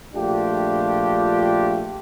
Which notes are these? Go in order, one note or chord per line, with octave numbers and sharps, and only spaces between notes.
A#1 A3 D4 F4 G4